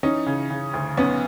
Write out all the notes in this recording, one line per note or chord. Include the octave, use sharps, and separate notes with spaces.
E3 C#4 D#4
C#3
C#3
D2
B1 B3 C#4